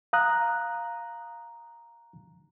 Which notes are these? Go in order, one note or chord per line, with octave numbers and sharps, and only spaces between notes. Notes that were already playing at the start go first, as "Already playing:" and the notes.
F5 A#5 D#6 F#6